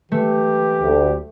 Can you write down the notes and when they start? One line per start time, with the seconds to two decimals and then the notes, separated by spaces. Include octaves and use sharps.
0.12 E3 A3 G4
0.81 D2